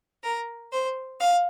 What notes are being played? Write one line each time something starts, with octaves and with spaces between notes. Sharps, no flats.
A#4
C5
F5